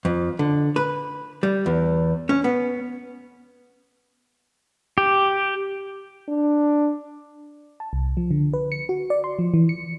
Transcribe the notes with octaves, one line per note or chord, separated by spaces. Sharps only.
F2
D3
B4
G3
E2
C#4
B3
G4
D4
A5
C2
F3
D3
B4
C#7
F#4
D5
C6
F3
E3
C#7